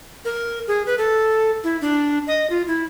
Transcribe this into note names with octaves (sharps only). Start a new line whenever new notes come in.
A#4
G#4
B4
A4
E4
D4
D#5
F4
E4